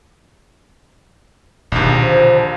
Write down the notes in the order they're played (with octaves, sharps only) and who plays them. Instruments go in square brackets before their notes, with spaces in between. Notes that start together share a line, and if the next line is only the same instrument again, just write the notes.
[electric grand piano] A#1 D#2 [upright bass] B2 D3
[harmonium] F3